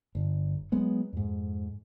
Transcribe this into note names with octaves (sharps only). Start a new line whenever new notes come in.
G1
F#3 G#3 B3
F2 G#2